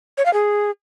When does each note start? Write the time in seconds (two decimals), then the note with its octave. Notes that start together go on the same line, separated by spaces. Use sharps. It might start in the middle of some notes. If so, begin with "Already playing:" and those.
0.18 C#5
0.26 F5
0.33 G#4